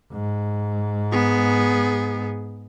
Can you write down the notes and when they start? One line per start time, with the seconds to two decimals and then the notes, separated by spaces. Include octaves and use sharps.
0.13 G#2
1.12 B3 G#4